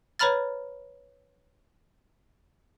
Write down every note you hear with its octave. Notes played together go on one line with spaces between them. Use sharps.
B4 C#5 A#5 B5 F6 A6